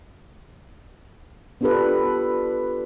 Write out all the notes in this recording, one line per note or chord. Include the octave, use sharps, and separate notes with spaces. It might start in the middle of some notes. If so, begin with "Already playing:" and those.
B3 D4 F4 G4 A4 B4